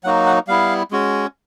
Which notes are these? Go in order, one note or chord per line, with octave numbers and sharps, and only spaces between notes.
F#3 A#3 D#4 F#4 F#5
F#5
G3 B3 E4 F5
G#3 C#4 F#4